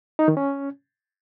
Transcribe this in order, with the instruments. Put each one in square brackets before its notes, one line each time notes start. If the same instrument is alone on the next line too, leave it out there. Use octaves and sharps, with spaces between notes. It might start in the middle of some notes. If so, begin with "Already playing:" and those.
[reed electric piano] D#4
D#3
C#4